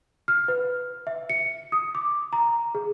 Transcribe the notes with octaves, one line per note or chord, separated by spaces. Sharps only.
F6
B4
E5
C#7
D#6
D6
A#5
G#4